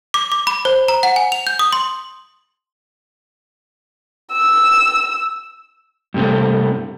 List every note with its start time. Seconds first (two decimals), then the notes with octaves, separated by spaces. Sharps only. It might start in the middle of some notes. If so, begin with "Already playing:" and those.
0.14 D6
0.32 D6
0.47 B5
0.65 C5
0.88 A#5
1.03 F#5
1.16 G#5
1.32 F7
1.47 G6
1.59 D#6
1.73 C6
4.32 E6
6.14 G2 C3 A3